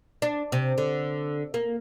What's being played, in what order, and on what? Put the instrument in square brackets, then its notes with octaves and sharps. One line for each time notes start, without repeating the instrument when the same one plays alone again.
[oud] D4
C3
D3
A#3